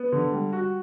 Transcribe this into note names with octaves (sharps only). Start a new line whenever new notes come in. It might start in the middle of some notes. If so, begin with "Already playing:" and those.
Already playing: B3
D3
G3
F#4